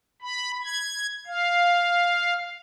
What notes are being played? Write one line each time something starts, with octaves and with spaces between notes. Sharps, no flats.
B5
G#6
F5